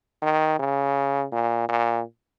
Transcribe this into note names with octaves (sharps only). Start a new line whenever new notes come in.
D#3
C#3
A#2
A#2